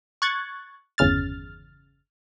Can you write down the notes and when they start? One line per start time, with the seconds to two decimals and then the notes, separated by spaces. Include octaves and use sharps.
0.22 C#6 F#6 G#6 A6
0.98 G1 E2 C#3 F6 A6